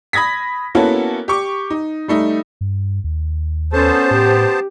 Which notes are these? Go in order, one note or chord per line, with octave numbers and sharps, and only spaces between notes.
B5 D#6 G#6 A#6 B6
A#3 B3 C#4 E4 F#4 A4
G4 C#6 D6
D#4
G3 A3 D#4
G2
D#2
B3 C#4 A4 C5 A5
A2 G4